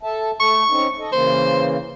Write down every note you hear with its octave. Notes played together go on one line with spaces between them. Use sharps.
A4 E5 A5
A3 A4 C#6
C4 C#4 D#4
A4 D#5
C#3 E3 A#3 C5